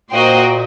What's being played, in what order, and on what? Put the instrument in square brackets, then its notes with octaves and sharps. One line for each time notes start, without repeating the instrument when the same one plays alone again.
[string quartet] A#2 [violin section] A#3 F#4 C5 D#5 G5